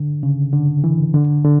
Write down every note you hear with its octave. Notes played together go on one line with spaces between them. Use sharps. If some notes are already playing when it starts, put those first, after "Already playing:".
Already playing: D3
C#3
D3
E3
D3
D3